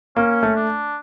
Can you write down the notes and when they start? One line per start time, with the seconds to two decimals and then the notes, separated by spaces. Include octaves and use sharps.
0.16 A#3 C#4
0.43 A3
0.56 D4